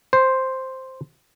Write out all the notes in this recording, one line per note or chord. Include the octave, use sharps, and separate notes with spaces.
C5